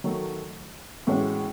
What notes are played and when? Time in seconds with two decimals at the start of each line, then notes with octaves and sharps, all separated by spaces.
0.04 D#3 F#3 A3
1.07 A2 E3 G#3 C#4 F#4